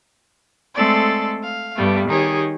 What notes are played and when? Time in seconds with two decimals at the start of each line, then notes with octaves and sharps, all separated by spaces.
0.76 G#3 A3 C4 A4 D5 A6
1.44 F5
1.75 G2 G3 A3 B3
2.08 D#3 D#4 G4 G#4 C#5